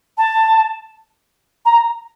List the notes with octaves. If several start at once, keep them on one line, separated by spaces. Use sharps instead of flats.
A5
A#5